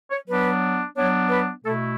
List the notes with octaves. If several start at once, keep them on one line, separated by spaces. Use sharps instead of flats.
C#5
F#3 B3 D4 B4
F#3 B3 D4 C#5
B4
B2 A3 E4 A4